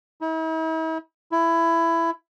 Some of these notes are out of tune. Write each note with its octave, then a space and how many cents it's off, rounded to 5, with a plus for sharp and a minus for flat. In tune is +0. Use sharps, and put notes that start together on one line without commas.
E4 -45
E4 +15